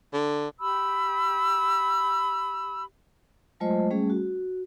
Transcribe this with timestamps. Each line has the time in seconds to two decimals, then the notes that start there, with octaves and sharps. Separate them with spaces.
0.13 D3
0.60 G4 B5 E6
3.60 F#3 G#3 A3 F4 C5 D#5
3.91 G3 A3 C#4 G#4
4.10 F#4